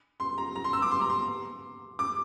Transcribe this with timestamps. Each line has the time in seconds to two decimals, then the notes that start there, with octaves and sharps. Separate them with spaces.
0.20 C6
0.38 A#5
0.55 A#5
0.64 C6
0.73 E6
0.82 D6
0.91 C6
1.01 A#5
1.10 C6
1.99 D6